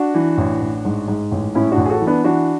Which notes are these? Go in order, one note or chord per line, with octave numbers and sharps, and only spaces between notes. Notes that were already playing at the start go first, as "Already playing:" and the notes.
Already playing: D4 F#4
E3
A1
A1
G#2
G#2
A1
A2 C#4 E4
D4 F#4
A1
G#4
F#4 A4
E3
B3 D4
E3 D4 F#4